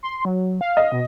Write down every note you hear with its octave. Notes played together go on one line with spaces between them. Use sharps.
C6
F#3
F5
D#5
B2